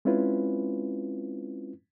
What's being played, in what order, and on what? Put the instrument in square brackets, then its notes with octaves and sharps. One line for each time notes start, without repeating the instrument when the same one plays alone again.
[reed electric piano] G#3 C4 C#4 E4 F4 B4